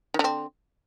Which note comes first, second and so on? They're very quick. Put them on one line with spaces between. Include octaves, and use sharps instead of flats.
D#3 D3 C4